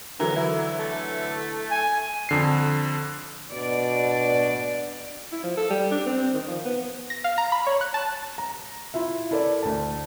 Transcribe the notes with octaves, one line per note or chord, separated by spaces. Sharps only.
D3 E3 F#3 A#4
E4
A3
G#5
F2 D3 C7
B2 D4 D5
E4
F3
A4
G3
D4
C4
D#3
F3
B3
A#6
F5
A#5
B5
C#5
F#6
A5
A#5
E4 F4 E5
E4 A4 A#4 D5
D2 A5